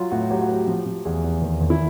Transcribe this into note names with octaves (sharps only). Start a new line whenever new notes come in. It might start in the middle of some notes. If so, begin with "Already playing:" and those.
Already playing: F#3 F4
A2 F#4
F#3 G4
F#4
F#3 G4
F3
F3
E2 G#4
E2
D#2
D#2
E4